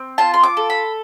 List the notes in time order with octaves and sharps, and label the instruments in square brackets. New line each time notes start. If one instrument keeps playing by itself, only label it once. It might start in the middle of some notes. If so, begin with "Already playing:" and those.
Already playing: [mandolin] C4
F4 A5
C6
D6
A4
B5